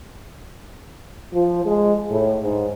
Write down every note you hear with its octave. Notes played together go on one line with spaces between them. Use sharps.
F3
G#3
A2
G#2